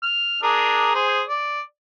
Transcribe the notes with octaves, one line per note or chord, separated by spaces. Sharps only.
F6
D4 G#4 A#4
G#4 C5
D5